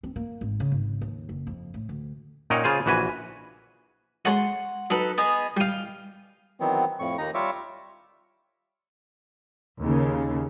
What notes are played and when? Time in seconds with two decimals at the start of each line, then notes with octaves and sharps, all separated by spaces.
0.03 C4
0.16 A#3
0.41 G#1
0.60 C#3
0.72 G#1
1.01 D#2
1.29 F#1
1.47 F2
1.74 A2
1.89 D2
2.50 A#2 C#4 D#4 F#5 G5 A#5
2.64 C#3 F4 G#4 C5
2.86 A#1 E3 F#4 B4 G#5
4.25 G#3 C#5 D#5 F#5 A5 C6
4.90 F#3 D#4 A4 B4
5.18 B3 G#4 D#5
5.57 G3 F5 G5 D#6
6.60 D#3 E3 F#3 B3 C4
6.99 F2 A2 C#6
7.18 D#2 D#4 A#5
7.34 G3 F4 C#5 E5 D6
9.81 D#2 C#3